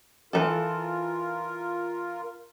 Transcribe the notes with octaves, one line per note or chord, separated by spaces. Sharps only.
E3 A3 F4 A4 A#4